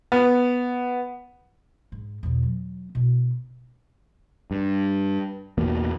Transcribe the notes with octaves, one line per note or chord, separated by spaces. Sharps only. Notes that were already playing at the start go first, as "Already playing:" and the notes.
B3
G#2
E2 B2
F#3
B2 E4
G2
A1 E2 B2 A#3